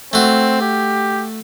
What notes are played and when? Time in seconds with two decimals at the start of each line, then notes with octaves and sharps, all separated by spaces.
0.13 A3 C4 F#4
0.61 G4